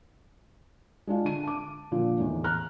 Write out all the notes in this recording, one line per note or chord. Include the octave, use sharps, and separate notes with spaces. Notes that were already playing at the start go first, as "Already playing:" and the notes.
G#3 D4 F4
D3 D#7
A5 D6
A#2 D3 F3
E2 A2 D#3
A#5 F6 F#6